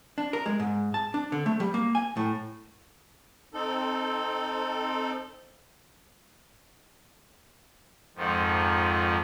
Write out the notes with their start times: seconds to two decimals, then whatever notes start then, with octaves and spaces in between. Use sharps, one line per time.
0.18 D4
0.33 A#4
0.46 G#3
0.60 G#2
0.94 A5
1.14 D4
1.32 D3
1.46 A3
1.60 G3
1.74 A#3
1.95 G#5
2.17 A2
3.53 C4 D#4 A4
8.16 F2 G#2 D#3 F3